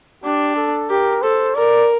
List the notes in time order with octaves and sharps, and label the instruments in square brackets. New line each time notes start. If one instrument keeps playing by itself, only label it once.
[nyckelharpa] D4 [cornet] G4
[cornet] A4
[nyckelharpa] G4 [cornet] A#4
[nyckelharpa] A4 [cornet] C5
[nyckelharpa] A#4 [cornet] D5